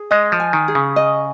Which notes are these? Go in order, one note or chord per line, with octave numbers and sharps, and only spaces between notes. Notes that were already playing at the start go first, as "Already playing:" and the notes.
Already playing: G#4
G#3 D#5
F3
G#5
D#3
G#4
C#3
D#5